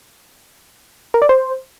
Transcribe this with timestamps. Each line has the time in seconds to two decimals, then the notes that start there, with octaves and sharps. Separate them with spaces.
1.14 A#4
1.22 D5
1.29 C5